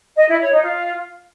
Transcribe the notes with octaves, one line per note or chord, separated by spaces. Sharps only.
D#5
E4
C#5
D#4
F4